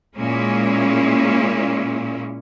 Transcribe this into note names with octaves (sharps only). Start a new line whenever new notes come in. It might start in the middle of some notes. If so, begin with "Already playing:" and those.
A#2 G#3 A#3 C#4 E4